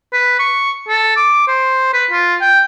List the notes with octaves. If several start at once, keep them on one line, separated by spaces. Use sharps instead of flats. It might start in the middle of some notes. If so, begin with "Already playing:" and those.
B4
C#6
A4
D6
C5
B4
F4
G5